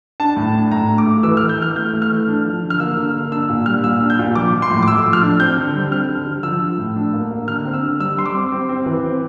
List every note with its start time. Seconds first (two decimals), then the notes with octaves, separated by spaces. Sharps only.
0.20 D4 A5
0.37 A2
0.55 D4
0.71 A2 A#5
0.89 A3
0.98 D6
1.07 A3
1.23 E3 E6
1.37 E3 F6
1.49 G6
1.58 E3 F6
1.76 A3 G6
1.93 A3
2.02 F6
2.11 E3
2.28 D4
2.45 F3
2.63 D3
2.70 F6
2.80 A#3 E6
2.97 D3
3.14 A#3
3.31 D4 E6
3.49 A#2
3.66 G3 F6
3.84 A#2 E6
4.01 D4
4.10 G6
4.19 A#2
4.35 F3 D6
4.53 F3
4.62 C6
4.71 A2
4.83 D6
4.88 A3 E6
5.05 F3
5.13 F6
5.22 D4
5.40 C4 G6
5.57 D3
5.75 G3
5.91 C4 F6
6.09 D3
6.26 D3
6.43 F3 E6
6.61 F3
6.78 A2
6.96 D4
7.14 A#3
7.31 A#3
7.47 D3 F6
7.65 C4
7.73 E6
7.83 D3
7.99 G3 E6
8.17 G3 C6
8.26 D6
8.35 C4
8.52 C4
8.69 C4
8.86 E3
9.04 C4